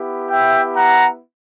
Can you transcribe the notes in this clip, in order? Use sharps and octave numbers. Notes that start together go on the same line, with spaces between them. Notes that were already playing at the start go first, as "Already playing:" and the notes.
Already playing: B3 E4 G4
E5 G5
F#5 A#5